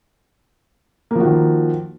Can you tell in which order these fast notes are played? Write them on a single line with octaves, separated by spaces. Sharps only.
A#3 F3 F#4 D#3